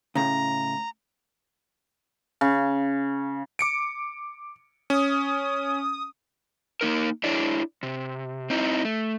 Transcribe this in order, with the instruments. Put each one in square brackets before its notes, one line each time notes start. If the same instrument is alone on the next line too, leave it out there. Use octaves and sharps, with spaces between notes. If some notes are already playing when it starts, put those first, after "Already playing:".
[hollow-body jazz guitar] A2 C#3 [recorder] A#5
[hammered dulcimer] C#3
[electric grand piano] D6 C#7 D7
[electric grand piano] C#4 [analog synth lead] D#6
[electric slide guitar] A#3 D#4 A#4
D4 E4 G#4 C#5 D5
C3
C4 D#4 E4
A3